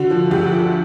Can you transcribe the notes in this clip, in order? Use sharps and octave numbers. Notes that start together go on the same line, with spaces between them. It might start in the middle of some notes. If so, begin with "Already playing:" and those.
Already playing: D3 F#4
F3
D2 G4
F3